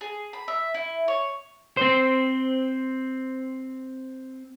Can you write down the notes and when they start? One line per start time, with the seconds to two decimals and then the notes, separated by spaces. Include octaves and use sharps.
0.01 G#4
0.33 B5
0.48 E5
0.74 E4
1.08 C#5
1.77 C4 C5